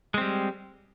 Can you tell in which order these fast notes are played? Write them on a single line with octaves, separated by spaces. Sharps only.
G#3 C4 G3